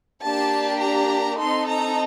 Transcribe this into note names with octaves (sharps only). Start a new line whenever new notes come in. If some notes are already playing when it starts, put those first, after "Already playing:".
A#3 D4 G4 A5
A#5
C4 D#4 A4 C6
A#5